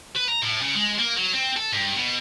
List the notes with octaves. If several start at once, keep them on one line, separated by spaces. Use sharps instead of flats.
B4
A#5
A2
C#3
G#3
A#3
F#3
C4
A4
G2
B2